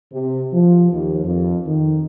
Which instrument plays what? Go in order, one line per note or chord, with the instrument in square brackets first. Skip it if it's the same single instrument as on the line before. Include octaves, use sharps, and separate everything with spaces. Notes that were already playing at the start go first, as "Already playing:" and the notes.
[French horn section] C3
F3
D#2
F2
D#3